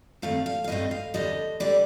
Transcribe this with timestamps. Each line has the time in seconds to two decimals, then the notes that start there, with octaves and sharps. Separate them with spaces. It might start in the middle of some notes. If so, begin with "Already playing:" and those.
0.22 G2 D#3 A3 C4 F5
0.46 F5
0.64 F5
0.68 G2 D#3 A3 C4 D#5
0.91 F5
1.14 D#2 D3 G3 D#5
1.60 D3 G3 D5